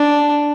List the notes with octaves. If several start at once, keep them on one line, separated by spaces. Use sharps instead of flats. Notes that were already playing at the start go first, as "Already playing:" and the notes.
Already playing: D4